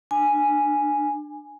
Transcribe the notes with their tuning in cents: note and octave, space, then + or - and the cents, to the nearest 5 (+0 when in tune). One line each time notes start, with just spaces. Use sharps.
D4 +25 G#5 +0